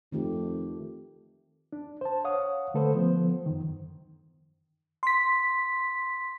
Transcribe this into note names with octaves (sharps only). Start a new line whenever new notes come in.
F2 D#3 A3 G4
D4
C5 A5
C#5 F5 F#5 D#6
D3 A3 A4 B4 C5
F3 B3 C5
F#2 D#3
C6 B6